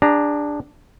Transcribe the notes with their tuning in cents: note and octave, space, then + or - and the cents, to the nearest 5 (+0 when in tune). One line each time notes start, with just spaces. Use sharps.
D4 +0 G#4 -35 A#5 +0